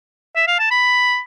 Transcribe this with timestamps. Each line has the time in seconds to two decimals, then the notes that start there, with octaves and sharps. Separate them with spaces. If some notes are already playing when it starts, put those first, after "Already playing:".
0.36 E5
0.47 F5
0.59 A5
0.71 B5